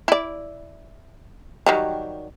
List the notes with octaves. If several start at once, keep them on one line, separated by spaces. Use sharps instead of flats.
E4 D5
D#3 F#3 G3